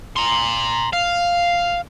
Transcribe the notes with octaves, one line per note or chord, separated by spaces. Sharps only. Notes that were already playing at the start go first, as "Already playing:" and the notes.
A#5 C6
F5